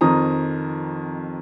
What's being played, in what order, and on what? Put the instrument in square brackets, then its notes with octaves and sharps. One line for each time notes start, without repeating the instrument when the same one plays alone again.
[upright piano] F2 D#3 C4 A#5 D#6